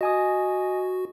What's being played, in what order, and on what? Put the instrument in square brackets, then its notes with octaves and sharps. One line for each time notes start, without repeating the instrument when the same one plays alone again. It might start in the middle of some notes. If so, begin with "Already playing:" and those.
[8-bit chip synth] F#4 [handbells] D#5 G#5 D#6